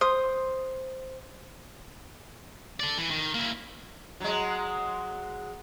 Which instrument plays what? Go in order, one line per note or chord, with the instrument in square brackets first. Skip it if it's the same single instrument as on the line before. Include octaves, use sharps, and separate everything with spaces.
[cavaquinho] C5 D#6
[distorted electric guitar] A4 D5
E3
D#3
A#3 E4
[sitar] F#3 G#3